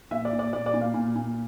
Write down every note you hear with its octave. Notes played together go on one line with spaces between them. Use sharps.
A#2 E5
D5
A#2
D5
A#2 D5
D5
A#2
F5
A#2
A#2